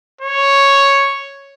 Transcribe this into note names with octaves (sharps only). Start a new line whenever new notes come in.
C#5